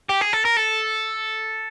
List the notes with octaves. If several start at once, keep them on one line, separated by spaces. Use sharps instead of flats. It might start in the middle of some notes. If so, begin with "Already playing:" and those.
G4
G#4
A4
A#4
A4